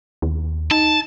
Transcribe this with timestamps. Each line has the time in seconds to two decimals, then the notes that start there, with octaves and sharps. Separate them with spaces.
0.22 D#2
0.71 D#4 A5